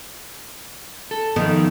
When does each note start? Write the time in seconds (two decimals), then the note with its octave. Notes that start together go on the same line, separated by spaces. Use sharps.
1.11 A4
1.36 D#3 F3 B3